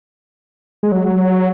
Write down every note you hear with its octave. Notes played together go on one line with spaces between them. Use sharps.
G#3
F#3